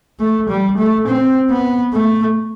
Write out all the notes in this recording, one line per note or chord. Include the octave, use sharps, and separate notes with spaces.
A3
G3
A3
C4
B3
A3